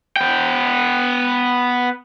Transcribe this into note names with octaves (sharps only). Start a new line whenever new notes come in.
B3 G5